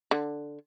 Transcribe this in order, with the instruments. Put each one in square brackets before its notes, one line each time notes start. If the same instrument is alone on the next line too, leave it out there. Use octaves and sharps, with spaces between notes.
[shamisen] D3